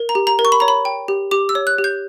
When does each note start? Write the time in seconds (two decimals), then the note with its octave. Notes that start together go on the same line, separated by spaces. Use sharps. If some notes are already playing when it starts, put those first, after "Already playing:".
Already playing: A#4
0.09 A#5
0.15 G4
0.27 A#5
0.39 A#4
0.45 C#6
0.52 B5
0.60 C#5 A#5
0.68 B5
0.85 G5
1.08 G4
1.31 G4 D6
1.49 E6
1.55 C#5
1.67 F#6
1.78 G4
1.84 G6